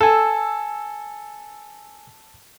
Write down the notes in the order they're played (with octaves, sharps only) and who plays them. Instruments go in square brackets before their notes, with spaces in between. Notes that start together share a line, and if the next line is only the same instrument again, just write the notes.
[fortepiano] A4 [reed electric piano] G#5 E6